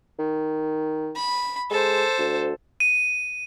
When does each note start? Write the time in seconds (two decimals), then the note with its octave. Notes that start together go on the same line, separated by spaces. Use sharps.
0.19 D#3
1.16 B5
1.70 G#3 A4 C5
2.18 D2
2.80 D#7